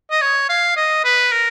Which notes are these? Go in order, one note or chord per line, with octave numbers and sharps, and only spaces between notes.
D#5
C#5
F5
D#5
B4
A#4